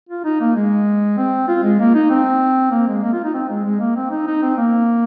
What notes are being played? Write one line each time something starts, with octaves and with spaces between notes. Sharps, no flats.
F4
D#4
A#3
G#3
C4
F4
G#3
A#3
D#4
C4
A#3
G#3
A#3
F4
D#4
C4
G#3
G#3
A#3
C4
D#4
D#4
C4
A#3